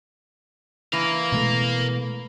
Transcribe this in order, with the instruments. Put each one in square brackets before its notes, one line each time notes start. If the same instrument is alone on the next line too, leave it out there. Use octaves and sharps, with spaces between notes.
[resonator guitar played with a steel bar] E3 [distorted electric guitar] A#4 F5
[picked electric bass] B2 G#3 A3